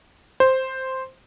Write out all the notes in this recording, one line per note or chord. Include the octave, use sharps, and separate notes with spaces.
C5